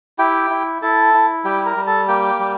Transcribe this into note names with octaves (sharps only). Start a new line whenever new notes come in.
E4 G4 G5
E4
E4 A4 A5
E4
G3 G4 G5
A#4 A#5
G3
A4 A5
A#3 G4 G5
G3